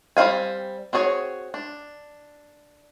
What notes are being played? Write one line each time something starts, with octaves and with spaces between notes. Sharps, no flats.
G3 C4 E4 F5 G#5
C4 F#4 G#4 A4 C#5
D4